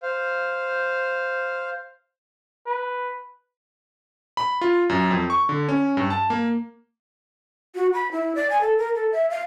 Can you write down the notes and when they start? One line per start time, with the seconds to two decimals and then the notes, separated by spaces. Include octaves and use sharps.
0.03 C5 F5
2.67 B4
4.37 B5
4.61 F4
4.90 F#2
5.11 F2
5.30 C#6
5.49 D3
5.69 C#4
5.97 G2
6.10 A5
6.30 A#3
7.75 F#4
7.94 B5
8.12 E4
8.35 D5
8.50 G#5
8.61 A4
8.78 A#4
8.95 A4
9.12 E5
9.30 F5